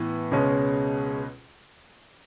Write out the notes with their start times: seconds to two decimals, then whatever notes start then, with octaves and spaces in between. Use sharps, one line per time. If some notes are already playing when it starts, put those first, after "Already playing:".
Already playing: A2 E3 B3
0.31 C#2 B2 G#3 C#4